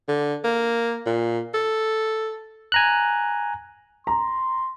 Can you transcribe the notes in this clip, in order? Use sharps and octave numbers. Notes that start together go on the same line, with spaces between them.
D3
A#3
A#2
A4
G#5 A#5 F#6
A#5 C6